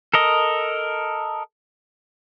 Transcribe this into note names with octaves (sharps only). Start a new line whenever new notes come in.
A4 A#4 D#5